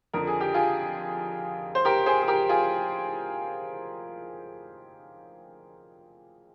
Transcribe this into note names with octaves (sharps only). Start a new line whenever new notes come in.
F2 D3 F3 A#4
G#4
G4
F4 G#4
C5
G4 A#4
G#4 C5
G#4
G4 A#4
F4 G#4